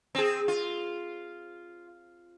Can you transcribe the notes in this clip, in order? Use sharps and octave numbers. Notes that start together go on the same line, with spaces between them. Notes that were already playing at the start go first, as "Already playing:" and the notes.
C4 G#4
F4